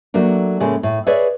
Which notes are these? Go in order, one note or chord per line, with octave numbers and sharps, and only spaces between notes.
F#3 A3 A#3 D4
A2 C#3 G#3 A#3
A2
G#4 B4 C#5 D5 E5